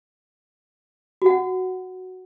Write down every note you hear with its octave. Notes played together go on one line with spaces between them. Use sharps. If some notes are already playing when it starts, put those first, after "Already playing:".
F#4 F#5